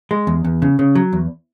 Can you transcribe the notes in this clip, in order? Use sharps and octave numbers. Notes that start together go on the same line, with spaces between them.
G#3
E2
E2
C#3
C#3
F#3
E2